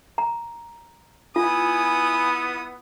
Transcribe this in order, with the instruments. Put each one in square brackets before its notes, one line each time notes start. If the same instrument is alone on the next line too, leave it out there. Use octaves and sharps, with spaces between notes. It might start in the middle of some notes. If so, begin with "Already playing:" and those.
[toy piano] A#5
[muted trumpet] B3 [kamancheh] E4 D#6 [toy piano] F4 [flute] G#5